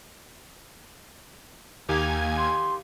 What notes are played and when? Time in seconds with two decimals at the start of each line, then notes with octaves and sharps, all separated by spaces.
1.89 D#2 A#3 D#4 G4 G#5 G#6
2.38 C6